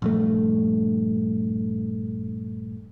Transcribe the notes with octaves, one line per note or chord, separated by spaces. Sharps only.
A#1 G2 A3